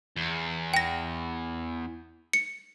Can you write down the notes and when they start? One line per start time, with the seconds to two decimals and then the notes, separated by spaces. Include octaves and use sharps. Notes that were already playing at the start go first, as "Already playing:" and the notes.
0.16 E2
0.74 G5 A#6
2.33 C#7